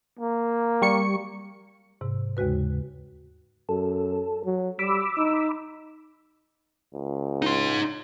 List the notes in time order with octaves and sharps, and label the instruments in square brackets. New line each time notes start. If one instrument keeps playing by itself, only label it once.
[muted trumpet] A#3
[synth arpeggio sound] G3 C#6 C#7
[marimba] G#2 C3
D#2 C#3 G#3 F#4 B4
[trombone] F#2 [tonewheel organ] A4
[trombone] F#3
[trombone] G3 [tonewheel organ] B5 D6 E6
[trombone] D#4
[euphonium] C#2
[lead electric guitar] D#4 C6